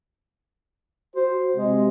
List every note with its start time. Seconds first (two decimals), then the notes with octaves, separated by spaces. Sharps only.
1.16 F#4 C5
1.57 C3 G#3